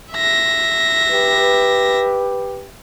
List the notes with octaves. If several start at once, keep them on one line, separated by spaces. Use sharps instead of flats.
E5 A#6
G4 B4